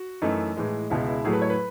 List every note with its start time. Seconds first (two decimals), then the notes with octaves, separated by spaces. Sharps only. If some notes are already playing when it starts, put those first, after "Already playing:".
Already playing: F#4
0.22 F#2 E3 A3 D#4
0.57 A2 E3 G#3
0.90 C#2 B2 G#3 E4
1.07 E4
1.24 A2 F#3 A3 G#4
1.33 B4
1.42 C#5
1.50 B4